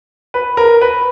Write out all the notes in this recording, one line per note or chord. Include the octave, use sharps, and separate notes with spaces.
B4
A#4
B4